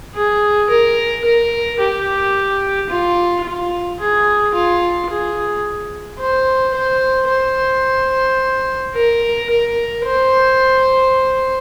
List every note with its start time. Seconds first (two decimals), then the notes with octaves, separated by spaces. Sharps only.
0.15 G#4
0.70 A#4
1.25 A#4
1.80 G4
2.90 F4
3.45 F4
4.00 G#4
4.55 F4
5.10 G#4
6.20 C5
6.75 C5
7.29 C5
8.95 A#4
9.50 A#4
10.04 C5